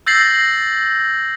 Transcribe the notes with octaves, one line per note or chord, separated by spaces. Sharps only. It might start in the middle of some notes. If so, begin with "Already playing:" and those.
E6 G6 A6 A#6 C7 F#7